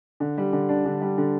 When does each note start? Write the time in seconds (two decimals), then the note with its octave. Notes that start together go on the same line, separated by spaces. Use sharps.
0.20 D3
0.38 G3
0.53 D3
0.69 D4
0.86 D3
1.01 G3
1.18 D3